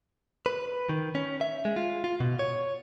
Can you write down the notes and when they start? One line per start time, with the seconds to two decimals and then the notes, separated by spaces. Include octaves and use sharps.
0.46 B4
0.89 D#3
1.15 C#4
1.41 E5
1.65 G#3
1.76 F4
2.04 F4
2.20 B2
2.39 C#5